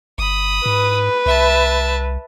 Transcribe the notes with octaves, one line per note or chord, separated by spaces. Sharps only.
G1 B5 D#6
G#2 B4
C2 E5 A5